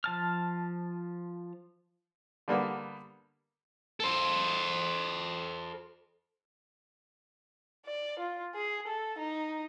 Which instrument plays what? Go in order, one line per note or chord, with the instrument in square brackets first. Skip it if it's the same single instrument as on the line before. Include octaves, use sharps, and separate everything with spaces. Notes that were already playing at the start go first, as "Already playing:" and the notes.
[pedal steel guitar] F3 A5 F6
[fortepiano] D3 G3 A#3 B3
[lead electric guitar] A4 C5
[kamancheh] D5
F4
G#4
A4
D#4